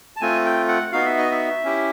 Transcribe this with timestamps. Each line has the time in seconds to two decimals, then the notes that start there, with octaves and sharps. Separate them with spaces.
0.16 A5
0.21 A3 C4 F4 G#5
0.45 G5
0.68 F#5
0.92 B3 D#4 F#4 F5
1.06 E5
1.18 D#5
1.31 E5
1.64 C#4 E4 G4